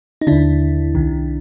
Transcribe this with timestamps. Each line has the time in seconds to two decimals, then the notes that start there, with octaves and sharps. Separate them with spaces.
0.21 D#4
0.27 D#2 D3 D4 E4
0.95 C2 C3 D#3